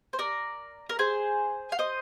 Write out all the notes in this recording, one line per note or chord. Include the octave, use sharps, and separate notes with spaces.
C5
A#4 D5
A#4
G#4 C5
F5
C5 D#5